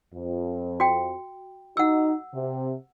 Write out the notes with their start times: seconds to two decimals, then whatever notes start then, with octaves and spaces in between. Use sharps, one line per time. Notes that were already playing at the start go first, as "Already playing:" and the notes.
0.14 F2
0.80 F#4 G5
1.77 D#4 F#4 F#5 E6
2.34 C3